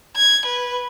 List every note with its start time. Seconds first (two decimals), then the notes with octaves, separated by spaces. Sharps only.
0.16 G#6
0.45 B4